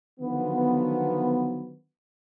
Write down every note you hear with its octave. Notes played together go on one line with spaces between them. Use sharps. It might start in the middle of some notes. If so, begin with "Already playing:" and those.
D3 D#3 F3 F#3 B3